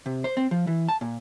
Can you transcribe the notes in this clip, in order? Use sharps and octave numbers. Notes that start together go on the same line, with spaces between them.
C3
C5
C4
F3
E3
A5
A#2